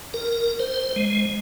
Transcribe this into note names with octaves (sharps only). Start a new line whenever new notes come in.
A#4
C5
G#3